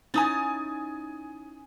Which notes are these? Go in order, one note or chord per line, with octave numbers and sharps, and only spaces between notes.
C#4 D#4 E4 G#5 D#6 A6